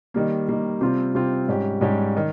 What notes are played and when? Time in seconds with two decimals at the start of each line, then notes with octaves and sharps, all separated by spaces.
0.14 D#3 G3 A#3
0.48 D#3 G3 A#3
0.81 C3 G3 C4 F4
1.15 C3 G3 C4 F4
1.48 G#2 G3 C#4 G4
1.81 G#2 G3 C#4 G4
2.17 D#3